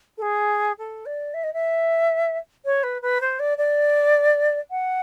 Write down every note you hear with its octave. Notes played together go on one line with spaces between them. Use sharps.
A4
G#4
A4
D5
E5
D#5
E5
C#5
B4
B4
C5
D5
D5
F#5